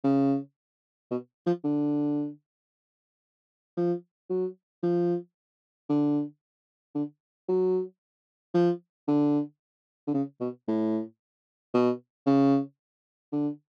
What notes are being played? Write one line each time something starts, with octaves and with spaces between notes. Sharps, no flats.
C#3
B2
F3
D3
F3
F#3
F3
D3
D3
F#3
F3
D3
D3
C#3
B2
A2
B2
C#3
D3